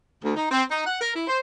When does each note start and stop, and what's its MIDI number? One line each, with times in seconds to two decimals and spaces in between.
0.23 0.34 38
0.36 0.45 63
0.50 0.62 60
0.70 0.85 63
0.85 1.00 78
1.00 1.11 70
1.14 1.24 64
1.27 1.39 72